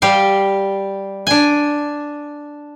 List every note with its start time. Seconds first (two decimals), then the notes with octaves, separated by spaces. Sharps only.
0.02 G3 G4 F5
1.27 D4 G#5